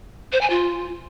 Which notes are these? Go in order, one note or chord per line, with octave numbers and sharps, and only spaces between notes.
C5
G#5
F4